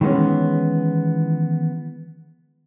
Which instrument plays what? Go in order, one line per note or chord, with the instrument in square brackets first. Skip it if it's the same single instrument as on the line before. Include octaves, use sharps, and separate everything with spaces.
[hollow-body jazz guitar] D#3 E3 G#3 B3 C#4